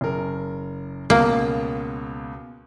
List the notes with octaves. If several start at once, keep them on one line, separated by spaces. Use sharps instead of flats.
F#1 A#4
C#2 B2 A#3